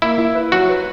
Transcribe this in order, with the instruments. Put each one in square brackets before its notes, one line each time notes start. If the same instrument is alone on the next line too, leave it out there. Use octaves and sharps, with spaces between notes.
[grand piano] A#3 [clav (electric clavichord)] E4
[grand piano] E4
B4
[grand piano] F#3 [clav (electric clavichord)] F#4
[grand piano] B4